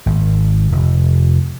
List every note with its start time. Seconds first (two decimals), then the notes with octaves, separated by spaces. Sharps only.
0.06 G#1
0.72 F1